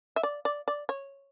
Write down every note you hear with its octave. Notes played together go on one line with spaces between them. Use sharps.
E5
D5
D5
D5
C#5